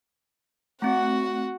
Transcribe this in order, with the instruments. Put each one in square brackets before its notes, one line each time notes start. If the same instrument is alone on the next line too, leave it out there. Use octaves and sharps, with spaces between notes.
[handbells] A3 C4 [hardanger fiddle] F#4 F#5